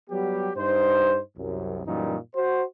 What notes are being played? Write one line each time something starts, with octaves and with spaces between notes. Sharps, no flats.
F#3 G3 B3 G4
G2 D#4 C5
C2 F#2
F#2 A#2 E3 G3 D#4
F#4 C5